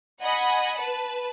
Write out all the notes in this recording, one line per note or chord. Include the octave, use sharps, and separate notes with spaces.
D#5 F#5 G#5 B5
B4 A5